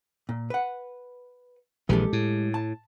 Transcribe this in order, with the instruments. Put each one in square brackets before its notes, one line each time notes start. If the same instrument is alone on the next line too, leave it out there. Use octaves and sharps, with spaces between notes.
[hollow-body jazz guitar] A#2
B4 F#5
[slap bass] A#1 E3 [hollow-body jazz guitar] G#3 G4 A4
[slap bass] A2
[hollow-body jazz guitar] A5